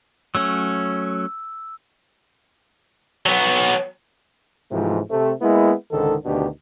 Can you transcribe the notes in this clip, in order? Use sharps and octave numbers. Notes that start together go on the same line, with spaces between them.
F#3 A3 C#4 E6
F#3 B3
G#2 C3 E3 F3 A3
C3 A3
G#3 A#3 B3 E4
C#2 G#2 D3 D#3 A4
D2 B2 D#3 D4 G4